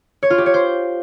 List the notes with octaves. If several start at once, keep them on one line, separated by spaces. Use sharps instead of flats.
C#5
F4
G4
C#5
C5